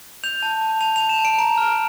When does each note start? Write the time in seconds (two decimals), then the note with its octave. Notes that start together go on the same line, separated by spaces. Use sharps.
0.24 G6 F7
0.43 A5
0.61 A5
0.81 A5 F7
0.96 A5 F7
1.09 E7
1.19 A5
1.25 D7
1.38 A#5 D7
1.58 F6